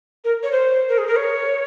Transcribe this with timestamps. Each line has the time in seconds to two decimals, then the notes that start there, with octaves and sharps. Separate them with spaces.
0.24 A#4
0.43 C#5
0.52 C5
0.88 A#4
0.98 G#4
1.07 A#4
1.16 C#5